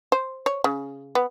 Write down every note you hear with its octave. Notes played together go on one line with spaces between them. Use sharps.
C5
C#5
C#3
B3